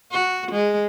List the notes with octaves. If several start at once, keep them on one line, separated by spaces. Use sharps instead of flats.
F#4
G#3